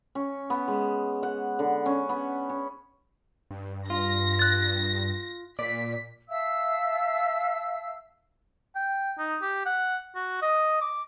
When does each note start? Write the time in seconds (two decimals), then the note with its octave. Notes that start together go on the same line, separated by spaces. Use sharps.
0.15 C#4
0.50 B3
0.68 G#3
1.23 F#5
1.59 D3
1.86 C#4
2.09 B3
2.50 C#4
3.51 G2
3.90 F4 A#6
4.39 F#6 A6
5.59 A#2 D5 B6
6.28 E5 F5 A5 E6
8.75 G5
9.18 D#4
9.42 G4
9.66 F#5
10.15 F#4
10.42 D#5
10.81 D6